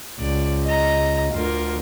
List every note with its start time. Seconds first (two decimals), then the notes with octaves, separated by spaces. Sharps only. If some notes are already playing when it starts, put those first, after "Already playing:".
0.20 C#2 D5
0.65 D#5 A#5
1.34 D2 D3 F4 A#4